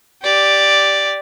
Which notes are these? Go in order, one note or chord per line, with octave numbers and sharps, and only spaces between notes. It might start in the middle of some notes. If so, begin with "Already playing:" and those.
G4 D5